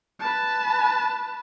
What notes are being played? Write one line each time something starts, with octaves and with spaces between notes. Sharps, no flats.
B4 A5